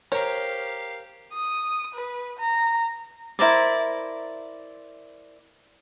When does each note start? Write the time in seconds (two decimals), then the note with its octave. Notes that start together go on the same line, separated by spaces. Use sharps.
0.12 G4 A#4 C5 C#5 F5 A#5
1.33 D#6
1.95 B4
2.39 A#5
3.39 E4 A#4 C5 D5